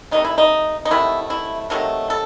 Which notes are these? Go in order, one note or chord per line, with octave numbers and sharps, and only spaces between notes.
C3 D#3 F#3 A3 D#4
E4
D#4
D#4
C3 D#3 F#3 A3 E4
E4
C3 D#3 F#3 A3
A4